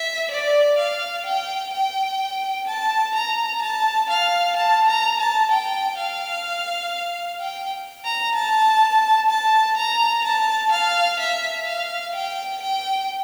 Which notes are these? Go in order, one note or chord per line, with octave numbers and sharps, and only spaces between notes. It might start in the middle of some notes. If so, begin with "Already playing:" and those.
Already playing: E5
D5
F5
G5
G5
A5
A#5
A5
F5
A5
A#5
A5
G5
F5
G5
A#5
A5
A5
A#5
A5
F5
E5
F5
G5
G5